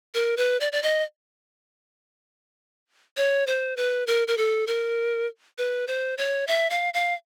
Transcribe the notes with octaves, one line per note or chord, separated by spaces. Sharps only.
A#4
B4
D5
D5
D#5
C#5
C5
B4
A#4
A#4
A4
A#4
B4
C5
C#5
E5
F5
F5